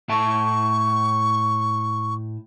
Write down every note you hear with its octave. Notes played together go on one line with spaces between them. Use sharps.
A2 E5 A5 C#6